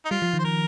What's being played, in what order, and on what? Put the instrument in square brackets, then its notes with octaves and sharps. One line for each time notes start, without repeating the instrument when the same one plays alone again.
[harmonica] D#4
[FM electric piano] G3 [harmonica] F4
[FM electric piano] F3
D#3
[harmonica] C5
[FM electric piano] D#3 [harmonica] A#4